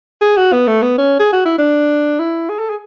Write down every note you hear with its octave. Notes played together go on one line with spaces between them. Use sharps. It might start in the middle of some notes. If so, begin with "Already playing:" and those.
G#4
F#4
B3
A3
B3
C#4
G#4
F#4
E4
D4
E4
G#4
A4
G#4